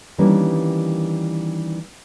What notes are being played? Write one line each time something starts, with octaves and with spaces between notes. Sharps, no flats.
D#3 E3 G3 A#3 C#4 D4